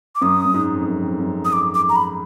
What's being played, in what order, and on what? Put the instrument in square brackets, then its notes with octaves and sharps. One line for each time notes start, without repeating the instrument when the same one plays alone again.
[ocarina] D6
[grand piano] F#2 [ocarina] D#6
[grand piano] F#2
G#2
F2
F#2
F2
F#2
[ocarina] D#6
D6
D6
A#5
B5